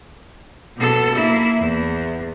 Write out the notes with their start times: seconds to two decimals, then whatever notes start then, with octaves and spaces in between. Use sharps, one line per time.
0.78 B2 A4
1.15 A#3 E4
1.59 E2